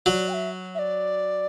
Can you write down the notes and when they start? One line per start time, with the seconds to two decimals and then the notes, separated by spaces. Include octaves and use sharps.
0.06 F#3 D5
0.29 G5
0.34 E5
0.75 E5
0.79 D5